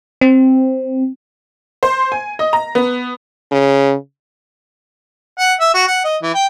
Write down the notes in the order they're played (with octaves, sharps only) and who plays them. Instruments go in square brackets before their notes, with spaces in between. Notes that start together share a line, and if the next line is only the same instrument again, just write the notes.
[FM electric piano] C4
[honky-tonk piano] C5
G#5
D#5
A#5
B3
[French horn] C#3
[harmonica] F#5
E5
F#4
F#5
D#5
E3
G5